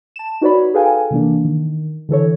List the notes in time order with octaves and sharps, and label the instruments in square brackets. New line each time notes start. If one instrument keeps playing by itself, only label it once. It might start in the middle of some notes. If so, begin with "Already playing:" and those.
[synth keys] A5 E7
D#4 F#4 B4 C#5 D5 B5
G#4 A4 B4 F5 G5 G#5
C3 E3 A#3 D4
D#3
D3 E3 A4 C#5